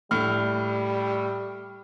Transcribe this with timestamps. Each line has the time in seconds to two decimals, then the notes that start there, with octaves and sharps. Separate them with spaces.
0.11 A2 G3 F6